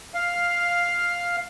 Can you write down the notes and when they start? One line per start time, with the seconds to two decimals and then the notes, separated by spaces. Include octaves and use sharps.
0.15 F5